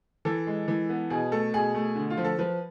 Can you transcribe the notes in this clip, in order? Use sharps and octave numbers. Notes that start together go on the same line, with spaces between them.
E3 A4
G#3
E3
B3
B2 G#4
A3 A4
B2 G#4
A3
D3
F4
F3
A4
F3 B4